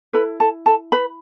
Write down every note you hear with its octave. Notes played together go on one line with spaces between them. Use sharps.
E4 A4 B4 B5
A4 A5
A4 A5
B4 B5